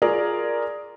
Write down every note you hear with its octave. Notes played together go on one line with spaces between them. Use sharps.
F4 G#4 A#4 D5